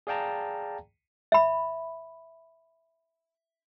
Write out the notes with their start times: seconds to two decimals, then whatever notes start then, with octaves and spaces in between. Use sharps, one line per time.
0.07 G#4 D5 F5 G5 A5 A#5
1.32 E5 B5